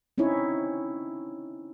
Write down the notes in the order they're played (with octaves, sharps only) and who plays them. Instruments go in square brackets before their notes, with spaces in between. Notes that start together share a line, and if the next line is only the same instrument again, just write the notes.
[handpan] C4 C#4 D#4 E4 C#5